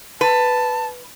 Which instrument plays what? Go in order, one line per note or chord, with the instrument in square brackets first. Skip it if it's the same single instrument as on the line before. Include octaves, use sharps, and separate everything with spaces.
[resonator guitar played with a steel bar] B4 [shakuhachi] A5